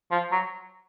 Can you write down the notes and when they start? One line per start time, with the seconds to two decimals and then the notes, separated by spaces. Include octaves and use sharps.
0.11 F3
0.32 F#3